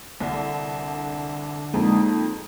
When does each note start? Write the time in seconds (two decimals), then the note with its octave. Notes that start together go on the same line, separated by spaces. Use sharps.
0.20 C2 D3
1.74 F2 G#3 A#3 D#4